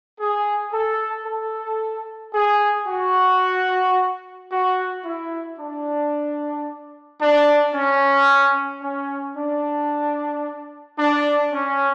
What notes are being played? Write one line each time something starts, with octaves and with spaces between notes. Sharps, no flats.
G#4
A4
A4
G#4
F#4
F#4
E4
D4
D4
C#4
C#4
D4
D4
C#4